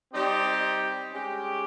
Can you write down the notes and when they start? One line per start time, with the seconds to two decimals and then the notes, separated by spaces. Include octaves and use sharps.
0.13 G3 C4 D#4 G4
1.12 G#3 C#4 G4